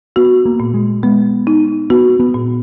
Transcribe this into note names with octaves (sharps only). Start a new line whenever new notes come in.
B3 F#4
A#3
A#2
G#3
G#3 B3
D#4
B3 F#4
B3
A#2